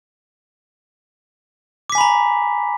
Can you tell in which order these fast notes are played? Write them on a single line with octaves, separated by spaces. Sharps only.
D6 B6 G#5 B5 A#5